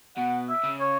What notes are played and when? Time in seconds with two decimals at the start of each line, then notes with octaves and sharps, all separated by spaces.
0.17 B2 F#5
0.49 E5
0.64 C#3
0.80 C#5